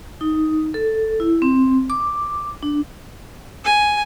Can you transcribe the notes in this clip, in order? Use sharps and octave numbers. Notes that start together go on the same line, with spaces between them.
D#4
A4
E4
C4
D6
D4
G#5